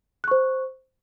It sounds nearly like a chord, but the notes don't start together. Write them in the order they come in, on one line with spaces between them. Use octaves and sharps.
F#6 C#6 C5